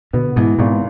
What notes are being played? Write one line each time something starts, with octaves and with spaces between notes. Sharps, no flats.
B2 D3 B3
G#2 B2 E3
G#1 G#2 B2